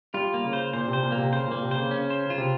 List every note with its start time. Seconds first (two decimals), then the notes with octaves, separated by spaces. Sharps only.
0.14 G3 F4
0.34 A#3
0.44 C#3
0.53 C5
0.73 A#2 C5
0.88 C3
0.93 C5
1.03 A#2
1.12 A#3
1.17 C3
1.32 C#3 C5
1.47 A#2 A#3
1.62 C3
1.71 C5
1.76 C#3
1.91 C#4
2.10 C5
2.26 C#3 F4
2.38 C3